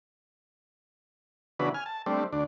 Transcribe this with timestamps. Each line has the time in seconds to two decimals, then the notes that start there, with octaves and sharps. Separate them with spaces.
1.60 C#3 E3 B3 D4 F#4 B4
1.74 G#5 F6
1.86 A5
2.06 G3 A3 C4 D4
2.33 D2 D4